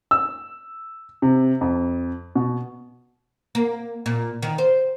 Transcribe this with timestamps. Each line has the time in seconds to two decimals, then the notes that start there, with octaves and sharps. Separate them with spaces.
0.11 E6
1.22 C3
1.61 F2
2.35 B2
3.55 A#3
4.06 A#2
4.42 D#3
4.58 C5